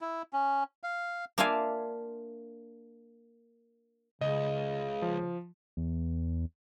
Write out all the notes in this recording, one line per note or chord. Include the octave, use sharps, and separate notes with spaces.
E4
C#4
F5
A#3 D4 F4 E5 F5 G#5
C#2 C#3 D#5
F3
E2